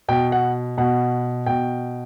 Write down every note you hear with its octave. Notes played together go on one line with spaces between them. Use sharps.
B2 G5
F#5
B2 F#5
B2 G5